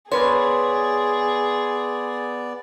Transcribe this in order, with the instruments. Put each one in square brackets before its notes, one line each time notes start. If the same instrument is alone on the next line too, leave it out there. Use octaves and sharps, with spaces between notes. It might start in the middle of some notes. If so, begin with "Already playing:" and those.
[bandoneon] B3 D5 [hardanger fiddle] G#4 [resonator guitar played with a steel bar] A#4 B4 C#5 [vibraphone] C6